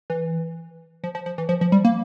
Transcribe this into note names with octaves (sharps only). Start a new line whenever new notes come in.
E3
F3
F3
F3
E3
F3
F3
G3
A#3